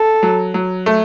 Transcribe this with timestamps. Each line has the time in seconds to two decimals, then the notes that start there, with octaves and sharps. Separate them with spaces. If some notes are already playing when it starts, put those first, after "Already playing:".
Already playing: A4
0.23 F#3
0.54 F#3
0.86 A3